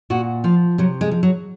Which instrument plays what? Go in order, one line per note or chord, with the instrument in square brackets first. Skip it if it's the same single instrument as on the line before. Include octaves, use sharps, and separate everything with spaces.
[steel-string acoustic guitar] A#2 F#4
F3 F4
C3 F#3
G#3
F3
F#3